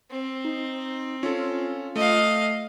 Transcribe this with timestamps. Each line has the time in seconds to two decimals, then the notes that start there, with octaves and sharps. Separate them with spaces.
0.11 C4
0.45 D#4
1.23 C#4 F4 A4
1.96 A3 D#5 F5